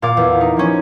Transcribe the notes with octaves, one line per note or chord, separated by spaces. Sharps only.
A#2 D5 F5 D6
E2
D#4
F3 C#4